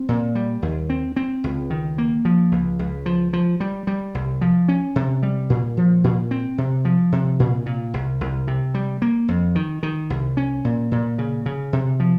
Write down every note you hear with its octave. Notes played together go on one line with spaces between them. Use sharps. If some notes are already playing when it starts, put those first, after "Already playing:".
Already playing: C4
A#2
G3
D#2
C4
C4
C#2
D#3
A#3
F3
C#2
C#2
F3
F3
G3
G3
C2
F3
C#4
C3
G3
A#2
F3
A#2
C4
C3
F3
C3
A#2
A#2
C2
C2
C3
G3
A#3
F2
D#3
D#3
C2
C#4
A#2
A#2
C#3
C#3
C3
F3